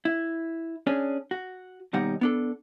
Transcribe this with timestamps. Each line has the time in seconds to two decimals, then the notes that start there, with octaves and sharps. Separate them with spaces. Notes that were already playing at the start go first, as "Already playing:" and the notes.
0.05 E4
0.87 C#4 D4 G#4
1.31 F#4
1.93 D#2 B2 G3 D#4 F#5
2.21 B3 D4 A4